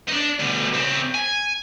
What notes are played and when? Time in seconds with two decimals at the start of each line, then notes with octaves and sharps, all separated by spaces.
0.09 D4 D#4
0.39 D2 B2
0.74 C#3 C4
1.15 G#5